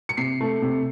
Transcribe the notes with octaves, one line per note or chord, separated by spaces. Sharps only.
C#7
C3 C7
A3
C3